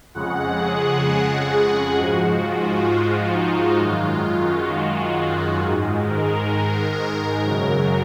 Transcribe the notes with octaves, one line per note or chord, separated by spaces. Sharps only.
F2 C#3 G#3 F#5
G#4
G#2 F3 G#3 F#4
F4
F4
D#4
F#2 D#3 G#3 F4
F4
F#4
G#2 D#3 G#3
A#4
F#2 C#3 F#3